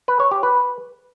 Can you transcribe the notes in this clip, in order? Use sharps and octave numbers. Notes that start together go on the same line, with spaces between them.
B4
C#5
G4
B4